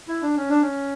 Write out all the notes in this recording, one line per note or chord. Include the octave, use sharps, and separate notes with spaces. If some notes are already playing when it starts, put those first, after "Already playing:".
E4
D4
C#4
D4
C#4